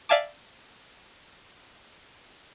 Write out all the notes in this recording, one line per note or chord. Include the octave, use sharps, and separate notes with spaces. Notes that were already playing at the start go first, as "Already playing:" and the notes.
D5 E5 F5 G#5 A5 D6